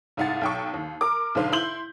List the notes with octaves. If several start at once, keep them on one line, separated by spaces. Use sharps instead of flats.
C2 G#2 F5 F#5 A6
B1 G5 C#6
D#2
A#4 D6
B1 G#2 D3 B4 C5 F5
E4 C6 G6 F#7